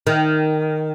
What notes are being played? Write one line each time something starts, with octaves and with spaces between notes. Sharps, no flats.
D#3